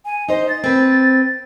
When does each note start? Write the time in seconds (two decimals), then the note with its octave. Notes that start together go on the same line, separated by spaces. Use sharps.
0.05 G#5
0.29 D#4 C5 D#5
0.49 A6
0.64 C4 B4